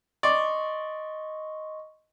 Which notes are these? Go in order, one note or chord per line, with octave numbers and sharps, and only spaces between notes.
D5 D#5 C6 C#6